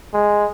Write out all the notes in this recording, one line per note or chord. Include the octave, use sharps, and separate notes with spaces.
G#3